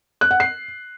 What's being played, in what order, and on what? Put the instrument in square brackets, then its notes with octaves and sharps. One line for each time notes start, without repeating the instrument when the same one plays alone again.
[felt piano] F#6
F#5
C7